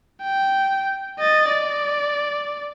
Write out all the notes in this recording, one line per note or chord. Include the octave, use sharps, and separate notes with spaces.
G5
D#5 A6
D5